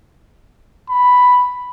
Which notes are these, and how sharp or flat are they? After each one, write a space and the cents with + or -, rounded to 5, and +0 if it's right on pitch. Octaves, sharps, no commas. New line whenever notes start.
B5 +0